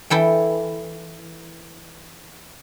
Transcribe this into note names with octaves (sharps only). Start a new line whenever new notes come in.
E3 E4 A4 G5